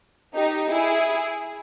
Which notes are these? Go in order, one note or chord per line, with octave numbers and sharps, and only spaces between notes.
D#4 G4
E4 G#4